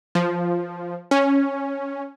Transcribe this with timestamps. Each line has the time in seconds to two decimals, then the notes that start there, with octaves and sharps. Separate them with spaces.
0.15 F3
1.11 C#4